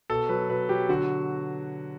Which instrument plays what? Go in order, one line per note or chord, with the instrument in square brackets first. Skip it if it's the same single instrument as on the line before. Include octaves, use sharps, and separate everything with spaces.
[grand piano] B2 A4
F#3 B4
B2 B4
F#3 G4
D3 F#4